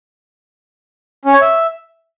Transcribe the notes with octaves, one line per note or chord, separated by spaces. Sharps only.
C#4
C#5
E5